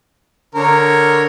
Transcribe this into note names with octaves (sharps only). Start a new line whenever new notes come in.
D3 A#4 C#5